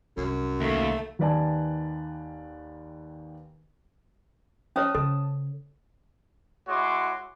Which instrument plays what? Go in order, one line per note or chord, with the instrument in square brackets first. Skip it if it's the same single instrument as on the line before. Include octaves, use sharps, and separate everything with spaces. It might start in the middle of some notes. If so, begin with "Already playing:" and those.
[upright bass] C2 [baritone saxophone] F#2
[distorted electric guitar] D#2 [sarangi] A3
[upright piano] D#2 D#3 B4 D5 G#5 A5
[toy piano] C#4 C5 C#5 [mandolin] A5 D#6
[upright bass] C#3 [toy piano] A4
[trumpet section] G#3 E4 F#4 C#5 C6 D6